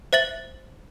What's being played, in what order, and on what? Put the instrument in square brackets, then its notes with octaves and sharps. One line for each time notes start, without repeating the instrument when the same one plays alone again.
[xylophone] C5 E5 A6 F#7